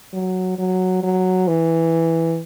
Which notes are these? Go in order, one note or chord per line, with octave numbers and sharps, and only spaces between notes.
F#3
F#3
F#3
E3